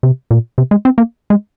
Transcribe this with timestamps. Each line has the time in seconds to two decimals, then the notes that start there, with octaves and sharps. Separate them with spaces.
0.03 C3
0.31 A#2
0.58 C3
0.71 G#3
0.85 C4
0.98 A#3
1.30 G#3